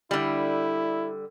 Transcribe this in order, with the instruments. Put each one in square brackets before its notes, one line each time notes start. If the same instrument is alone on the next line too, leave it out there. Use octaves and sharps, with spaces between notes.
[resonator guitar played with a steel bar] D3 G3 [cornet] E4